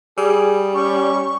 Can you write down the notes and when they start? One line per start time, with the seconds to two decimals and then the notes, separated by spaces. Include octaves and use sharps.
0.18 G3 G#4
0.75 C#4 C#6